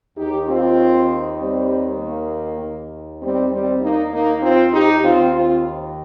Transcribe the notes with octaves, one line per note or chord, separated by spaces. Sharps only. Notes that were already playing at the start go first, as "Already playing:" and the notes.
D#2 D#3 D#4 G4
C4 F4
G3 C4
A#3
D#2 D#3
G3 C4
G3 C4
A#3 D#4
A#3 D#4
C4 F4
D#4 G4
D#2 D#3 C4 F4
C4 F4